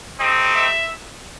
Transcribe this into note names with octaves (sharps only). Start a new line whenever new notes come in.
A3 C4 D#4 G4 D#5
E5